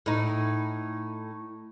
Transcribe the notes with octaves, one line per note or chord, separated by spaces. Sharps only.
A2 D#4